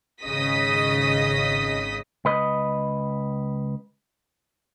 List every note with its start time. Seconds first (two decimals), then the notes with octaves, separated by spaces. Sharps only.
0.22 G#1 C#3 D#5 D#6 B6
2.25 C#2 B4 D#5